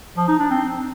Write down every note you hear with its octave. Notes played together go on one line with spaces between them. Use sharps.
F3
D#4
D4
C4